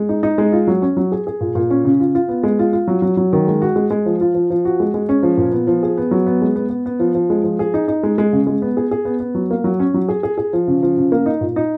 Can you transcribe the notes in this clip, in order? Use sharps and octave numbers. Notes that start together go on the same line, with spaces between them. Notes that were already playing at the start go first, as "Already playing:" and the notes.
Already playing: G#3
D#4
D#4
G#3
F4
F#3
C#4
F#3
G#4
G#4
A#2
A#2
C#4
C#3
F4
F4
B3
G#3
F4
F4
F#3
F#3
F#3
D#3
G#3
F#4
G#3
G#3
F3
F4
F3
F3
F#4
G#3
G#3
C#4
F3
A#2
B3
F3
G#4
B3
F#3
B3
G#3
B3
B3
B3
F3
F3
G#3
F3
G#4
D#4
D#4
G#3
G#3
C#3
G#3
B3
G#4
G#4
B3
B3
F#3
A#3
F#3
C#4
F#3
G#4
G#4
G#4
F3
C#3
F3
C#3
A#3
D#4
A#2
D#4